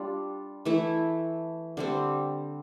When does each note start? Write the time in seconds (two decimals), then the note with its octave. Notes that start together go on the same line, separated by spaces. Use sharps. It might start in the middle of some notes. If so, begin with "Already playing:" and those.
Already playing: G3 D4 F4
0.65 E3 A3 E4
1.77 D3 G3 C4